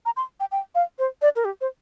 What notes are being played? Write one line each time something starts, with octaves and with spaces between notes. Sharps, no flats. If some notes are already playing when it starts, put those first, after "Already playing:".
A#5
C6
G5
G5
F5
C5
D5
A#4
G4
C5